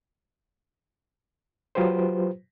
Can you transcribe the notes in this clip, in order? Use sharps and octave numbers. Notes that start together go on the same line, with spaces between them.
F#3 F4 G4 B4 C5